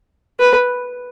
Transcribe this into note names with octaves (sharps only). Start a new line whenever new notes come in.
B4